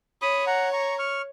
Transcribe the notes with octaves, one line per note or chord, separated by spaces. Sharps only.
C#5 B5 D#6
F#5 A#5
A#5 C#6
C#6 F6